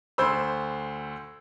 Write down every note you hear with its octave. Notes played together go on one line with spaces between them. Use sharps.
D2 C5 B5 C6 E6